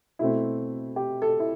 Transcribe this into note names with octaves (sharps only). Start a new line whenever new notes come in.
B2 A3 C4 E4
G4
A4
E4